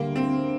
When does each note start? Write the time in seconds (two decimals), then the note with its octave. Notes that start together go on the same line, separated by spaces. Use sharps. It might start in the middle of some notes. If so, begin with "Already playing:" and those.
Already playing: D2 D3 G3 A#3
0.16 C4